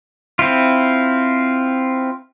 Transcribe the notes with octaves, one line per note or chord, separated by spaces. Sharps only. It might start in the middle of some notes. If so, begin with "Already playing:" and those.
C4 E4 F4